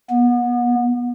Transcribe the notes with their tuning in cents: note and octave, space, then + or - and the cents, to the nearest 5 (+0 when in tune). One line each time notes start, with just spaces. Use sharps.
B3 -30